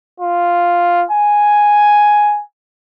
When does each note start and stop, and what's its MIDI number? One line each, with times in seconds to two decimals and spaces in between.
0.20 1.04 65
1.11 2.42 80